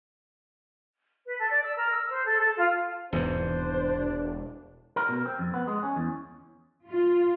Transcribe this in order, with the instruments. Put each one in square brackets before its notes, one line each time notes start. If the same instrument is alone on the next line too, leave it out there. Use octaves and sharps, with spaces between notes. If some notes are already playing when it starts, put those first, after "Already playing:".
[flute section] B4
A4
D5
E6
A#4
E6
C5
A4
A4
F4
[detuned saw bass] E1 [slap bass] E2 G#2 C3 [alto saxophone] D4 [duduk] C5
[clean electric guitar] A#4
B2
C4
F2
B3
G#3
C#4
E2
[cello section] F4